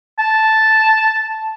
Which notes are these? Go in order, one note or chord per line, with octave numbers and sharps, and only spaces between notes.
A5